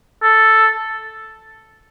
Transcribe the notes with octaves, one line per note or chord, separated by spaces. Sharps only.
A4